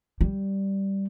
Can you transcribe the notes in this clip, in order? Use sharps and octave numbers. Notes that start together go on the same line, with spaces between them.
G3